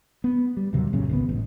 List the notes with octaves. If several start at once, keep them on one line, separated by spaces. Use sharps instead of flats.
B3
G3
D#2 C3 F#3 G3
B1 F#2 A#2 C#3
G#1 C#2 B3
A1